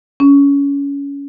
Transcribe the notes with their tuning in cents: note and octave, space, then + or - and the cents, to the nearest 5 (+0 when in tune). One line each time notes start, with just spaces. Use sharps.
C#4 +25